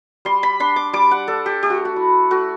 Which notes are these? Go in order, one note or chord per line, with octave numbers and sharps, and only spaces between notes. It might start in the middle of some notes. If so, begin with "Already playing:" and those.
G3 C6
B5
D4 C6
D6
G3 D6
F#5
D4 A4
G4
A3 G4
F#4
F#4
E4
A3 F#4